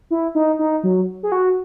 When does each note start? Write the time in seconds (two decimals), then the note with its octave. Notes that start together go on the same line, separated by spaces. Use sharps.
0.11 E4
0.35 D#4
0.59 D#4
0.84 F#3
1.23 G#4
1.32 F#4